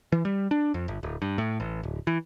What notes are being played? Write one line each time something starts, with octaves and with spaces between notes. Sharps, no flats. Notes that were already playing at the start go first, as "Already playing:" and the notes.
E3
G3
D4
F2
G1
D1
G2
A2
A1
D1
E3